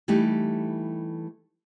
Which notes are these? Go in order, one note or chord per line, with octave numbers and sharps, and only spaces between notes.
E3 G3 A3 D#4 G4